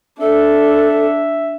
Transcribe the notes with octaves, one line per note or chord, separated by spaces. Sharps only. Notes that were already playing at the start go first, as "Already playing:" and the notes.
D4 A4 E5